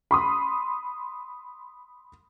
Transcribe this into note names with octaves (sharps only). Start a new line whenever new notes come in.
B5 C6 D#6